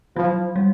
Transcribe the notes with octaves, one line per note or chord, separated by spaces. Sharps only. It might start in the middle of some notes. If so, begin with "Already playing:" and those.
F3 F#3
G3